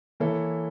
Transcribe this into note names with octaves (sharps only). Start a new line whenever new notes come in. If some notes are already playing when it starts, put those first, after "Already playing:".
E3 A#3 E4 A4 C#5